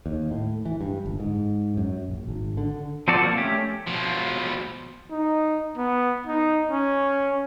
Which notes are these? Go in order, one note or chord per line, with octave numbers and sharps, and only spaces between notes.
D#2
A2
E3
G2
G1
G#2
F#2
A#1
G#1
D3
F3 C4 F#4 A4 D5
A#3
A3 C#4 G4
B2 F3
D#4
B3
D#4
C#4